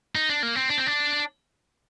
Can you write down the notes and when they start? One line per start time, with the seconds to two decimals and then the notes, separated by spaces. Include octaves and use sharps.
0.15 D#4
0.29 D4
0.43 A#3
0.56 C4
0.70 D4
0.78 C4
0.87 D4